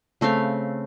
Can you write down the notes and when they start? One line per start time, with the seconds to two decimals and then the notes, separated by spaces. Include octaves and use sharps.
0.21 C#3 A3 C4 F5